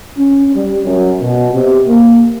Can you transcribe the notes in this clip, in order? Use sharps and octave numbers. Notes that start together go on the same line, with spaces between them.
C#4
G3
F#2
B2
C3
A#3